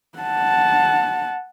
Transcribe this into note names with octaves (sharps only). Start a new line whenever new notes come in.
F#5 A5